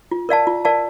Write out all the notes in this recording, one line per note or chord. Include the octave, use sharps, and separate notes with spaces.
F4
A#4 D5 F5 A5
F4
A#4 D5 F5 A5